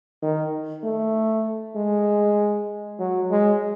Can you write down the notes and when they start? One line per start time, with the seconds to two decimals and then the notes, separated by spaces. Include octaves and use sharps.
0.23 D#3
0.84 A3
1.76 G#3
2.99 F#3
3.30 G#3